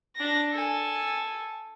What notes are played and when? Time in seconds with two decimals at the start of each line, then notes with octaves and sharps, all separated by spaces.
0.16 D4 A#6
0.52 A4 G#5